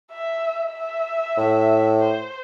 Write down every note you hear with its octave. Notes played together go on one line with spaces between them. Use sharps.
E5
E5
A2
C5